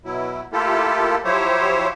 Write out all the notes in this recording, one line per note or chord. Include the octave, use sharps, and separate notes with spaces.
B2 F#3 E4
A3 A#3 E4 F4 G4 A4
F3 F#3 E4 G4 C5 C#5